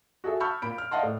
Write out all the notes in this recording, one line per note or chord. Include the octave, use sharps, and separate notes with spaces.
F#4 G#4 A4 E5
A5 B5 C#6 E6 F6 G6
A#2 B5 D7
F6
D5 D#5 F5 F#5 A5 C6
A2